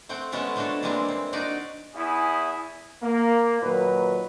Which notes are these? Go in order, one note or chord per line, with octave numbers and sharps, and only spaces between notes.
A3 C4 F#5 G5
G#3 A3 B3 C#4 E4 A4
F3 A3 D4 E4 F#4 A4
E3 G3 G#3 A#3 C4 D4
C4
D4 D#4 F#4 D5
E2 E4 G#5 D#6
A#3
A#2 D#3 F#3 B4